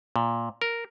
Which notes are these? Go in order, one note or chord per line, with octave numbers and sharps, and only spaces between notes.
A#2
A#4